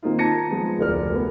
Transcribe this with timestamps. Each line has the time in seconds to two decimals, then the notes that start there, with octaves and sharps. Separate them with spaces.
0.03 D#3 A#3 C4 D#4 F4
0.19 A5 A#5 G#6 A#6 C#7 D#7
0.50 F3 G#3 B3
0.79 F1 D2 A#4 D5 F6
1.14 B3